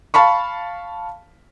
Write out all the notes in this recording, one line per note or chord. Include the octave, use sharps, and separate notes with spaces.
F5 A5 B5 C#6